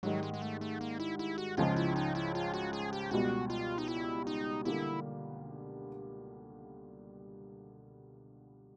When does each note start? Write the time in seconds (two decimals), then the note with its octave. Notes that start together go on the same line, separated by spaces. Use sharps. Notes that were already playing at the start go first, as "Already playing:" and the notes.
0.03 G#2 D#3 F#3 G3
0.23 G#3
0.34 G#3
0.42 A3
0.61 A3
0.81 A#3
1.00 E4
1.19 E4
1.38 F#4
1.57 C#2 C#3 F3 G#3 F4
1.76 E4
1.96 D#4
2.15 E4
2.35 F4
2.54 F#4
2.73 G#4
2.93 G4
3.11 C#2 B2 G3 F#4
3.50 F4
3.78 D#4
3.88 E4
4.27 D#4
4.65 D3 G3 A#3 E4